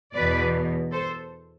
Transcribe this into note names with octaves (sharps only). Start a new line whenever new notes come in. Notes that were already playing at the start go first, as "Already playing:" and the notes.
E2 B2 B4 D5
A4 C5